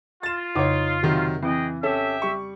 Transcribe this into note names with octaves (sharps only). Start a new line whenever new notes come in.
F4 A6 E7
F2 C#3 D#4 C#5
C3 D#3 F#3
E3 C4 G#4 D#5 G5
C#4 G4 A4 E5
G3 C#6